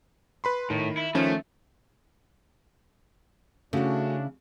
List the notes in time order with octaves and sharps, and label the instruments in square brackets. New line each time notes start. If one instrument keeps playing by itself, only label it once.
[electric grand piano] B4 B5 C6
[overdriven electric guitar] A2 [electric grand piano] D#3
[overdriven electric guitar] E4
[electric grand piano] D#3 F3 C#4 [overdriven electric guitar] A3
[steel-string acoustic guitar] C#3 E4 [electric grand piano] A3 F#4 [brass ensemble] C#4 D4